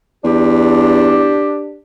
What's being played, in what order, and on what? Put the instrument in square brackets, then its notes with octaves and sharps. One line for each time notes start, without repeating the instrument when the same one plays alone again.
[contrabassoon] E2 [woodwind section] D4 G4